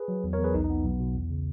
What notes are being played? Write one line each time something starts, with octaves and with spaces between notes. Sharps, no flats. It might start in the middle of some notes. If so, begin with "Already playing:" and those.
Already playing: G#4 B4
F#3
E2
A#4 C#5
E2
G#4 B4
B1 D#4
D#4
B3
B1
B2
E2
C#3